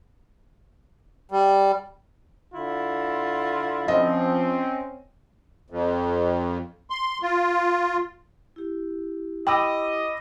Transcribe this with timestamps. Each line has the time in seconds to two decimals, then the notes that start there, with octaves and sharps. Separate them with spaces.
1.31 G3
2.54 D3 E4 F4
3.88 F3 C4 C#4 D#5
5.70 F2
6.90 C6
7.22 F4
8.56 E4 G4
9.47 D#5 G5 B5 D6 E6